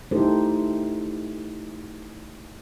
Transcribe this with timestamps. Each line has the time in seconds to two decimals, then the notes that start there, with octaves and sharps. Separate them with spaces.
0.11 A3 D#4 E4 G4 A4 C5